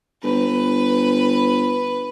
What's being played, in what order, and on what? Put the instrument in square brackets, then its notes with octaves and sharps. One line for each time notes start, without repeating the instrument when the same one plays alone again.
[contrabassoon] G1 [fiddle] B4